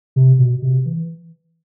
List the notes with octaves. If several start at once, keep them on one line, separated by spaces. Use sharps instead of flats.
C3
B2
C3
E3